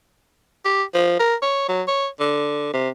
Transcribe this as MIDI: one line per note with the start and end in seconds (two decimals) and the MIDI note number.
0.65 0.83 67
0.94 1.17 53
1.19 1.35 70
1.42 1.66 73
1.68 1.83 54
1.88 2.08 73
2.20 2.71 50
2.73 2.89 48